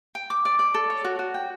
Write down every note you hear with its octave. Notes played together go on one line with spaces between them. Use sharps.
G5
D6
D5
D5
A4
C#5
F#4
F#4
G5